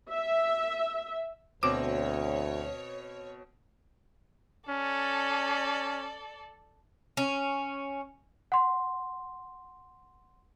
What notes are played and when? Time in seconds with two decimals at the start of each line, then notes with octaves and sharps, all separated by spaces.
0.10 E5
1.63 D2 B2 C4 C#5 D6 E7
4.69 C#4 A4 D5
7.17 C#4
8.52 F#5 C6